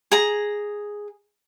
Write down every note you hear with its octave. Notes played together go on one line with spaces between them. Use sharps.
G#4 A#5